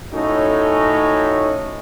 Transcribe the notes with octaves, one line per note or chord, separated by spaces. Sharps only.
A2 C#4 D#4 F#4 A4